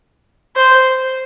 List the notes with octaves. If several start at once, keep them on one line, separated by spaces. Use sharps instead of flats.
C5